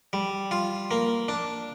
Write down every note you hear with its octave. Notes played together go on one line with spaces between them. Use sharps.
G3
F4
A#3
D4